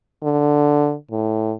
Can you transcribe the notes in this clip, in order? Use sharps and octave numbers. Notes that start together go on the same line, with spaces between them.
D3
A2